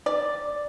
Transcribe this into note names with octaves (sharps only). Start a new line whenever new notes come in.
D5